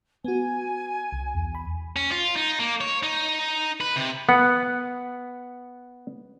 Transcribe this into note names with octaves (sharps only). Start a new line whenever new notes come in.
B3 F#4 G#5
C2
E2
B5
C#4
F4
D#4
A#3
C#5
D#4
B4
C3
B3 F#5